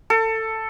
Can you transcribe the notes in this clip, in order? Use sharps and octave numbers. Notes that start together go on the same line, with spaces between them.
A4